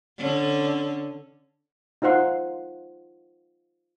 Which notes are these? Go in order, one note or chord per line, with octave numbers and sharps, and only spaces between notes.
D3 C#4
D#4 F4 C5 F#5 C6